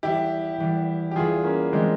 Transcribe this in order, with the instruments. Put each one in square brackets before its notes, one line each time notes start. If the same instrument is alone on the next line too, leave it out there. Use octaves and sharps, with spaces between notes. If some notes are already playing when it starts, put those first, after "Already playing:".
[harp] E2 E3 G3 [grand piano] E4 G4
[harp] E2 E3 G3
[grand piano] G4
[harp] E2 E3 G3 [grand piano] F4 G#4
[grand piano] A#3 C#4
[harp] E3 G3 [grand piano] G#3 C4